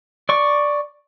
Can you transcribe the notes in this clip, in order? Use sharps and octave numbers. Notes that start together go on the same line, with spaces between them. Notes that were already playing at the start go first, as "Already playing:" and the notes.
D5 C#6